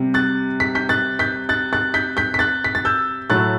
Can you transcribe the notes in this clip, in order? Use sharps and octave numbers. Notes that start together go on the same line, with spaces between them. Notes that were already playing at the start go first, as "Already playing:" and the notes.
Already playing: C3 G3
F#6 A6
B6
G6 B6
F#6 A6
G6 B6
F#6 A6
F#6 A6
G6 B6
G6 B6
B6
F#6 A6
B6
A6
E6 G6
A2 F#3 A3 F#6 A6